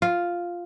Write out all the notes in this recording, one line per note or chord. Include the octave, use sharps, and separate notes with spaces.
F4